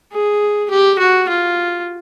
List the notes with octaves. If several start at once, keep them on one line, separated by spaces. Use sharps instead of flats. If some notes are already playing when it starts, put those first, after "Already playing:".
G#4
G4
F#4
F4